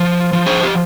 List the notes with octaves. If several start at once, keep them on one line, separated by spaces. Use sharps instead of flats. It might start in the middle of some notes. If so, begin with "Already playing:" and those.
Already playing: F3
F3
G#4 C5
G4